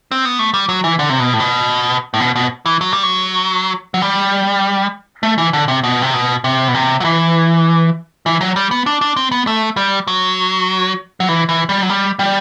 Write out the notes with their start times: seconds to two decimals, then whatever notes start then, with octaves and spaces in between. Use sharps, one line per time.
0.12 C4
0.25 B3
0.39 A3
0.54 G3
0.69 F#3
0.84 E3
0.99 D3
1.10 C3
1.20 B2
1.33 A2
1.40 B2
2.14 A2
2.20 B2
2.36 B2
2.66 E3
2.81 F#3
2.92 G3
3.03 F#3
3.94 F#3
4.02 G3
5.23 A3
5.38 E3
5.53 D3
5.68 C3
5.84 B2
6.02 C3
6.14 B2
6.44 C3
6.68 B2
6.74 C3
7.00 F#3
7.04 E3
8.26 E3
8.41 F#3
8.56 G3
8.71 B3
8.86 D4
9.01 D4
9.17 C4
9.32 B3
9.47 A3
9.77 G3
10.07 F#3
11.20 F#3
11.29 E3
11.49 E3
11.69 G3
11.82 F#3
11.89 G3
12.19 G3